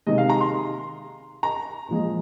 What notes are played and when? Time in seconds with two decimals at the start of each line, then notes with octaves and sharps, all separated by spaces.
0.07 C3 D#3 G#3 D#5
0.18 F5
0.29 A#5
0.40 C6
1.43 A#5
1.88 A#2 F3 G#3